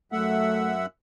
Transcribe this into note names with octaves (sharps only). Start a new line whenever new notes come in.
F#2 A3 E5 F#5